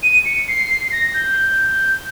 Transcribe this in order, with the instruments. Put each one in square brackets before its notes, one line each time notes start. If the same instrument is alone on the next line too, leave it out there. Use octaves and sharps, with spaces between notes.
[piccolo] D#7
C#7
C7
C7
C7
A#6
G6